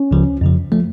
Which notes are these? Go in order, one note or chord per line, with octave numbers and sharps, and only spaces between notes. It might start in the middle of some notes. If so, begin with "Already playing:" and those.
Already playing: C#4
C#2 C#3 F3
F2 C#3 F3
F3 A3